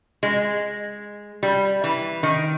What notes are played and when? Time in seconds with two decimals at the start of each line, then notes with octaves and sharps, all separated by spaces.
0.23 G#3
1.43 G3
1.84 E3
2.23 D#3